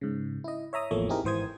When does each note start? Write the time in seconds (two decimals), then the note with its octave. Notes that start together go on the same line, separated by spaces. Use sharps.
0.01 G#2 C#3
0.44 E4 D#5
0.73 C#5 E5 A#5 D#6
0.91 A1 E2 F3 A3 A#3 C#5
1.09 C4 D#4 E4 G4 G#4 A#4
1.24 G#1 E3 C5 D#6 G#6